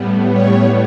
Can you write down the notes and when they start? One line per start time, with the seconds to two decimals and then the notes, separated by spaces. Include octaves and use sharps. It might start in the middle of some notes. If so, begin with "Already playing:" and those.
Already playing: A2 G3 B3
0.30 C#5